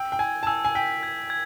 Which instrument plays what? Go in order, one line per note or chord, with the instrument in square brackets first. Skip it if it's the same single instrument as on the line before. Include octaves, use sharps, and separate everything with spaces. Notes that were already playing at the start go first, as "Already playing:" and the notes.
Already playing: [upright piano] G5 [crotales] E6
[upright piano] G5
[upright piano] G#5 [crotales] G#6
[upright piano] A5
[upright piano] G#5 [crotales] E6
[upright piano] G#5
[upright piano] G5 [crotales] B6
[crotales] G#6
G#6